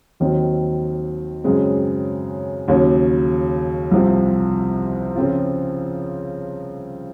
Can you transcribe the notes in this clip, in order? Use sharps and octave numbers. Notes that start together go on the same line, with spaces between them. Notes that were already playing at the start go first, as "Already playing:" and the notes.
D#2 D#3 F#3 C4
F#2 C#3 G#3 C4
D#2 C#3 F#3
C2 C3 F3 C4
C#3 F3 C4 F4